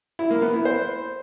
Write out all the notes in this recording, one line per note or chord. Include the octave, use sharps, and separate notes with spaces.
E4
A#3
B3
E4
C5